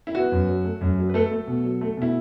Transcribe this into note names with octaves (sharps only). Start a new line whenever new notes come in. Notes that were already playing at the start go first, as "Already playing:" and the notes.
E4
B3 F#4
F#2
F#3
A3
F#2
F#3
B4
F#3 A3 A4
A3
B2
F#3
A3
B2 E4